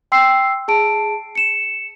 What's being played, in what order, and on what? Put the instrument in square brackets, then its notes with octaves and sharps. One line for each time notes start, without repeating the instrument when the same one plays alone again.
[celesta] G5 C6 E6 C7
G#4 A5 D7
C#7 E7